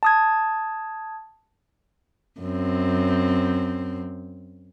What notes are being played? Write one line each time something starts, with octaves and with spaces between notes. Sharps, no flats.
A5 D#6 G#6
F#2 C4